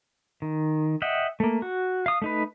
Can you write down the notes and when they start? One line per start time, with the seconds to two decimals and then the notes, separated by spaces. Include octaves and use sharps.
0.42 D#3
1.02 D#5 E5 F#5 G5
1.40 A3 A#3
1.62 F#4
2.06 F5 D#6
2.22 A3 D#4 B4